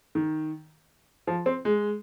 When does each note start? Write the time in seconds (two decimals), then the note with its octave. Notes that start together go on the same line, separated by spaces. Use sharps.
0.15 D#3
1.27 F3
1.46 C4
1.65 G#3